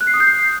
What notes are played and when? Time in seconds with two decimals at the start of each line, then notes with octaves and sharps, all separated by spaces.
0.01 F#6
0.07 C7
0.14 D#6
0.20 G6
0.27 C7